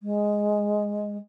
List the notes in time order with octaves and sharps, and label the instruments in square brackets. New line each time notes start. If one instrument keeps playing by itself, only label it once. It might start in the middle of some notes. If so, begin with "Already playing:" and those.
[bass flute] G#3